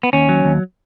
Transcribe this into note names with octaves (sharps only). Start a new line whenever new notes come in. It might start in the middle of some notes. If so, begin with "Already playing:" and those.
B3
D#2 C#4
F#3
D#2